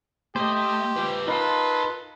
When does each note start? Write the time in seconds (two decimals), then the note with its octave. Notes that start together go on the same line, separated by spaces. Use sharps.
0.36 A3 G4 C5 D#5
0.96 F4 B4
1.28 D#4 F4 A#4 B4 A5